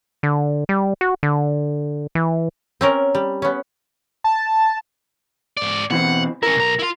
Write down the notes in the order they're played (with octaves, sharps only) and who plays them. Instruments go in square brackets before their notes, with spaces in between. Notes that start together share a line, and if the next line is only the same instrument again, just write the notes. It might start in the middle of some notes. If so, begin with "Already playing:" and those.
[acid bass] D3
G3
F#4
D3
E3
[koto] C4 C#4 A#4
G3
B3 C#4
[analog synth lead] A5
[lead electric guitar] G#2 D5
[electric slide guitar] B2 E3 C4 [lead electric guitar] F#5
[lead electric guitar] C#4 E4 [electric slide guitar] A#4
[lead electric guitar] B1 A#5
E4 F4